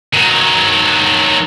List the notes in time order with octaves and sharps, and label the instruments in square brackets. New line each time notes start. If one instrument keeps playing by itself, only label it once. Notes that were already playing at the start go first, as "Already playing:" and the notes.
[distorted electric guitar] D#3 F#3